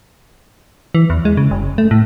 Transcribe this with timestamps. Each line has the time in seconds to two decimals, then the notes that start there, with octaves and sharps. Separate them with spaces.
0.95 E3
1.10 E2
1.25 G#3
1.37 C#3
1.51 F#1
1.78 A3
1.91 A2